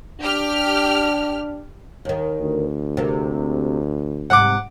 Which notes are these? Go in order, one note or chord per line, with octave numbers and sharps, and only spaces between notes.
D4 G4 F6
D#2 D#3
D2
C3 A#3
G#2 C3 F#5 D6